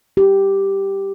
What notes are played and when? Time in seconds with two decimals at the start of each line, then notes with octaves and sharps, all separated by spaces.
0.17 G4